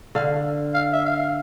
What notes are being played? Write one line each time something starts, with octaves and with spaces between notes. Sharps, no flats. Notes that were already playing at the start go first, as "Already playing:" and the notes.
D3 F5
F5
E5
F5